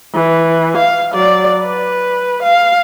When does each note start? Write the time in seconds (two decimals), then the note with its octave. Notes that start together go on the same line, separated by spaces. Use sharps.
0.14 E3
0.77 F5
1.13 F#3 D5
1.60 B4
2.43 F5